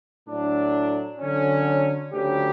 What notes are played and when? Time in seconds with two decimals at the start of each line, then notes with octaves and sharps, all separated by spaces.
0.26 A2 F#3 A3 D4
1.19 D3 F#3 C#4
2.12 D2 C#3 F#3 C#4 G4